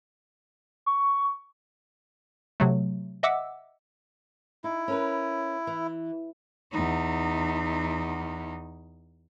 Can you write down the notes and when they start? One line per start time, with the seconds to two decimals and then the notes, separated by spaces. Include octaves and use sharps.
0.86 C#6
2.60 C3 F#3 A3
3.23 D#5 E5 F#5 D6 E6
4.64 D#4 E4
4.88 C#4 A#4 B4
5.67 E3
6.72 E2 D#4